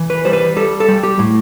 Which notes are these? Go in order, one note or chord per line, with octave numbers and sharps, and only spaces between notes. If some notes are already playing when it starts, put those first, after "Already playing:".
Already playing: E3
B4
G3 C5
B4
G3 A4
A4
G3
G4
A2